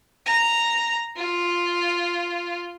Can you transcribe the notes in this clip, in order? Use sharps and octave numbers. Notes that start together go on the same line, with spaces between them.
A#5
F4